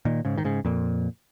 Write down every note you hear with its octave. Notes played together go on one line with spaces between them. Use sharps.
A#2 D#3
G#2 C#3
D#3
G#2 C#3
F2 A#2